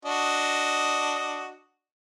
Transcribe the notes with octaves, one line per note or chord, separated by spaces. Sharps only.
D4 F#4 D#5